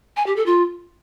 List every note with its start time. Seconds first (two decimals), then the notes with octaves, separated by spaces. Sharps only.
0.17 G#5
0.26 G4
0.36 A4
0.46 F4